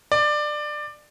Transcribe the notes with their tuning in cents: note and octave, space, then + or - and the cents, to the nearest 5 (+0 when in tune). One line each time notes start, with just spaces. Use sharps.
D5 +20